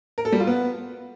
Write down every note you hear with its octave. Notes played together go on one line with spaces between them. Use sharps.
A#4
A4
G3
F4
B3